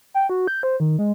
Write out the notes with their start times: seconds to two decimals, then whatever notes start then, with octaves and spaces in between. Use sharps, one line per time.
0.14 G5
0.29 F#4
0.47 G6
0.63 C5
0.80 D#3
0.99 G#3